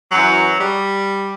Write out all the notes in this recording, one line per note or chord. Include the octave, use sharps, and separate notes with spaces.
F#2 F#3
E3
G3